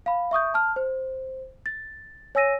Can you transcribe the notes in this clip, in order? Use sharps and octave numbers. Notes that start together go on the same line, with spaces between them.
F5 B5
E5 C#6 D#6 G6
A5 F6
C5
A6
C#5 G#5 E6 A#6 D#7